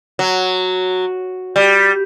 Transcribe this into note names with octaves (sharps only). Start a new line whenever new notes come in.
F#3
G3